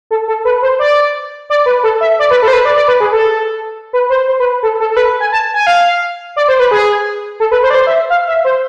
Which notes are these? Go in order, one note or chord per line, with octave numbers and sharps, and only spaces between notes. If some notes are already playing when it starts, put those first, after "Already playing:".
A4
A4
B4
C5
D5
D5
B4
A4
E5
D5
B4
A4
C5
B4
D5
D5
B4
G#4
A4
B4
C5
C5
B4
A4
A4
A4
B4
G#5
A5
G#5
F5
D5
C5
B4
G#4
A4
B4
C5
D5
C5
E5
F5
E5
C5